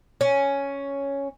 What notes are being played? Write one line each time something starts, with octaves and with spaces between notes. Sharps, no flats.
C#4